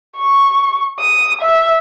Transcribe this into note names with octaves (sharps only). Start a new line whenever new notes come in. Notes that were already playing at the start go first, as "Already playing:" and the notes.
C#6
D#6
E5